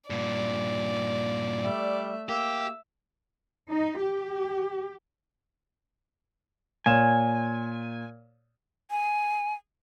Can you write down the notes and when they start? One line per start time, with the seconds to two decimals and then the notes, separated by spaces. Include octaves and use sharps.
0.10 G2 A#2 D5
1.64 G3 A3 E5
2.29 A#3 G4 E5 E6
3.69 D#4
4.00 G4
6.86 A#2 C#5 G#5 E7
8.91 G#5